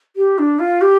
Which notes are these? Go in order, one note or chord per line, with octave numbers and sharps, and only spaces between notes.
G4
D4
F4
G4